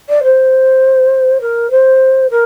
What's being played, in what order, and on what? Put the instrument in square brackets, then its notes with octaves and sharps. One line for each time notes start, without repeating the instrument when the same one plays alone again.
[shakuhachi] D5
C5
A#4
C5
A#4